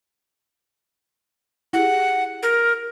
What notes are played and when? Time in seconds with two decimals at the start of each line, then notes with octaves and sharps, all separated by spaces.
1.73 E4 G4 G#4 F#5
2.43 A#4